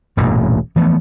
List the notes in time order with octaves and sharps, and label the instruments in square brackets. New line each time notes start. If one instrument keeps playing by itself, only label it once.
[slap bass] E1 A1 G2 A#2
E3 F3 A3 B3